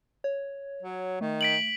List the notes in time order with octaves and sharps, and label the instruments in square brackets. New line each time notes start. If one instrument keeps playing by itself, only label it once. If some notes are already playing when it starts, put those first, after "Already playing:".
[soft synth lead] C#5
[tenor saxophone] F#3
[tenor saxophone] D#3 [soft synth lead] A3
[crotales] B6 D7 F#7